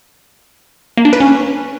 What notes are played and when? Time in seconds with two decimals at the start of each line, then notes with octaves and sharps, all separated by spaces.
0.97 A#3
1.05 D4
1.13 B4
1.20 C#4